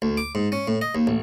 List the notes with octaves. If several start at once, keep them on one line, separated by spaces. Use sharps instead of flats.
D2
D6
G#2
C#4
A2
D#5
D#2
A1